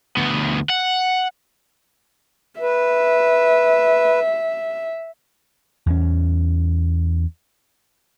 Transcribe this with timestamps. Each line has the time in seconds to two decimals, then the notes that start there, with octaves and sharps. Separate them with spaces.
0.17 D2 B3
0.70 F#5
2.61 B4 E5
5.86 E2 C#4